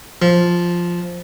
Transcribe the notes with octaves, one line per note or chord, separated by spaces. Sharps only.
F3